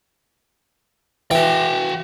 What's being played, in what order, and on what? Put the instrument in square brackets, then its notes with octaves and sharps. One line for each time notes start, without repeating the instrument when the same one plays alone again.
[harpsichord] E3 [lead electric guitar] F#4 G5